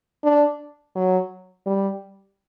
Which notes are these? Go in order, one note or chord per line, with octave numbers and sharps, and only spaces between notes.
D4
F#3
G3